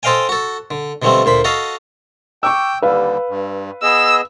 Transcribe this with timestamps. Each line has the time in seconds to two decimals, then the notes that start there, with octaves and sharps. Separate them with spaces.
0.03 A4 C5 D#5 F5 G5 G#5
0.29 F#4 A4
0.71 D3
1.02 B2 D3 F3 G3 A3 C4
1.25 D2 A#2 C5 B5
1.44 F#4 A4 D#5 F5
2.43 G5 C#6 D6 E6
2.82 D#2 D3 G3 B4 F5
3.29 G2
3.83 B3 G#4 D#5 E6